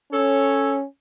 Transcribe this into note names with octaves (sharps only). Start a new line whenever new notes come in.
C#4 A4 C#5